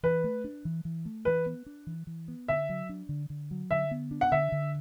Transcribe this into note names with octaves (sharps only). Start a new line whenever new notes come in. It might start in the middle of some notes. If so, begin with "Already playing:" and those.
E3 B4
A3
D4
E3
E3
A3
E3 B4
B3
D4
E3
E3
B3
D3 E5
F#3
D4
D3
D3
F#3
D3 E5
B3
D4
F#5
D3 E5
D3